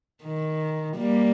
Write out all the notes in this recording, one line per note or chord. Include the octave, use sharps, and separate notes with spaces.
D#3
G3 A#3